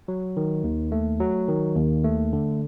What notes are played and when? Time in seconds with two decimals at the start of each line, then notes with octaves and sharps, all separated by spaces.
0.08 F#3
0.37 D#3
0.64 D#2
0.92 A3
1.20 F#3
1.48 D#3
1.76 D#2
2.04 A3
2.33 D3